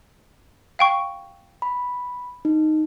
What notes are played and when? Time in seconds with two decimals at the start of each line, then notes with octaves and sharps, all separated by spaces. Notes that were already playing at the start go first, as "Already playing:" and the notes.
0.79 F5 G5 C#6
1.62 B5
2.45 D#4